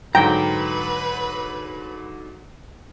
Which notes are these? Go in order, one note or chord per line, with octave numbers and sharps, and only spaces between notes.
G#2 D3 F#3 B4 G5 A#5